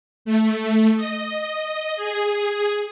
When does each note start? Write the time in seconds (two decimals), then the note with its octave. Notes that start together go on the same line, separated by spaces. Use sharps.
0.25 A3
0.96 D#5
1.96 G#4